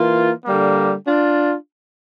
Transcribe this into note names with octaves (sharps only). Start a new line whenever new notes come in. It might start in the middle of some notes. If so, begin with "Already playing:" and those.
Already playing: E3 A#3 F4
D3 G3 A#3
D4 F4